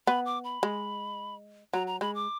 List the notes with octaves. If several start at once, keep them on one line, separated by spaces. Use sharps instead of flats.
B3 B5
D6
B5
G#3
F#3 A#5
A#5
G#3 B5
D6